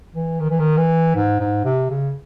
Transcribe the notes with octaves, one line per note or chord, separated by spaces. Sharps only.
E3
D#3
E3
D#3
E3
G#2
G#2
C3
C#3